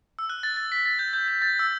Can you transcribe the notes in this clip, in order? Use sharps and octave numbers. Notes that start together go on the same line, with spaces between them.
E6
F#6
A6
A6
B6
A6
G6
G6
G6
A6
E6